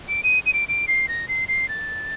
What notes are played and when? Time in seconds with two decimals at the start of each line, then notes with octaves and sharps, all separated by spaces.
0.09 D7
0.24 D#7
0.46 D#7
0.53 D7
0.69 D7
0.88 C7
1.08 A#6
1.28 C7
1.48 C7
1.69 A6